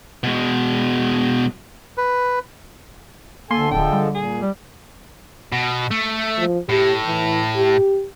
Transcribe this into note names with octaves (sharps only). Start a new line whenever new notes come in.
B2 G#3
B4
D2 D3 A#3 A4 G#5 C6
D1 F3 G#3 A4 G5
G3
A#2 G#4
G3
B2
A3
F3
A2 G4
E3
G4